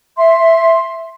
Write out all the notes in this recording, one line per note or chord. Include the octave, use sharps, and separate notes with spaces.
E5 C6